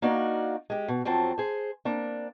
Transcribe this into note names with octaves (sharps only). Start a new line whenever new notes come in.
A#3 D4 D#4 F#4 D5 F5
G#3 G4
B2
F2 F#3 C4 A5
G#4 C5
A#3 C4 D4